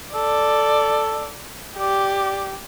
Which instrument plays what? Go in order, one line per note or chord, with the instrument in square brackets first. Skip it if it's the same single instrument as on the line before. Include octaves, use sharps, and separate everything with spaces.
[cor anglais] A4 [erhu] D5
[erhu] G4 [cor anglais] D5